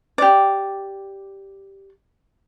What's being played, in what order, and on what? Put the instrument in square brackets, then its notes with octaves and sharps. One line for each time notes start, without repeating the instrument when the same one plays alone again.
[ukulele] G4 D5